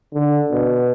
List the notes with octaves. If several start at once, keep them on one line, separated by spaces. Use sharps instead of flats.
D3
B2